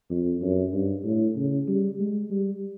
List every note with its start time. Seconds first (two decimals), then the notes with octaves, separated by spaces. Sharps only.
0.11 F2
0.42 F#2
0.73 G2
1.04 A2
1.36 C#3
1.68 G3
1.99 G#3
2.30 G3